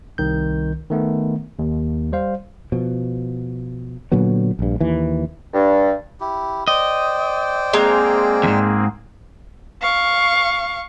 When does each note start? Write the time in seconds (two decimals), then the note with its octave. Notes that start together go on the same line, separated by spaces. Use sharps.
0.18 C2 D#3 G6
0.90 D#3 A3 B3
1.59 D#2
2.12 G3 C5 F5
2.72 B2 F3
4.12 A#2 D3 F#3 B3
4.59 A#1 G2
4.81 D#2 E3
5.54 G2
6.20 E4 G4
6.68 C5 D5 D#5 G5
7.73 G#3 A#3 C4 G#4 A#5
8.44 E2 G#2
9.81 F5 C#6